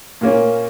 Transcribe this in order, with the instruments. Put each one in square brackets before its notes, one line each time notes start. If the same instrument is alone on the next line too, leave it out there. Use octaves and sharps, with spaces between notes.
[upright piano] A#2 A#3 C#4